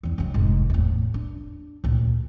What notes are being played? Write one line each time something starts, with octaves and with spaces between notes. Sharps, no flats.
E2 C4
F#2 D#3
F1 G#2
E2 A2
D4
D2 A#2